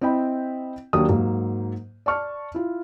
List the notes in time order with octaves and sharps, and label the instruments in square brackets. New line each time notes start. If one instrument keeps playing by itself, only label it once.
[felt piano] C4 E4 D#5 G5 B5
D#2 F#3 A#3 D4 D#6
G#2 F#3 A#3
D5 A5 C#6 F6
E4 F4